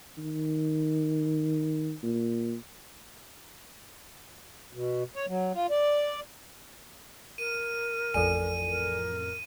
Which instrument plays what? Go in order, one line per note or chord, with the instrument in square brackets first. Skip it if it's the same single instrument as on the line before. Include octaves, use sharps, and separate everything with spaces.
[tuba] D#3
A#2
[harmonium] B2
C#5
F#3
F4
D5
[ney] A#4 [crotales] D#7
[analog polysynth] A1 F2 [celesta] A4 D5 G#5 [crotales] D#7
[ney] A#4